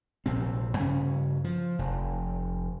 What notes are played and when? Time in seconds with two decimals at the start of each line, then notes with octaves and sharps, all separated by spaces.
0.26 A#1 C3 C4
0.79 G2 C#3 C#4
1.44 F3
1.79 F1